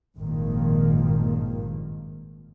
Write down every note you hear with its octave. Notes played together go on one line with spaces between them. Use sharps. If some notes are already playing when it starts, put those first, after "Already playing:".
G#1 G2 A#2 D#3 F3 A#3